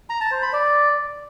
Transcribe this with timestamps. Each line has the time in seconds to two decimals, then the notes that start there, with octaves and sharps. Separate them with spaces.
0.10 A#5
0.20 A5
0.31 C5
0.42 B5
0.53 D5